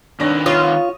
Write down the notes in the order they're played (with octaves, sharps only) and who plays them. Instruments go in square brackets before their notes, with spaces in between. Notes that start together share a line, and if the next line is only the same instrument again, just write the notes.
[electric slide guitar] D#3 C4 B4 [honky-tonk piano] D4 C#5 A#6
[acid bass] F4 [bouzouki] C#5 [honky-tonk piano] D#6